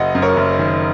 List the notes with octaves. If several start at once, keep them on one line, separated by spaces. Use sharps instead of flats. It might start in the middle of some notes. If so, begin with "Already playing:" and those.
Already playing: F#1 D#5 F#5
F#2
A#4 C#5
F#1
D#3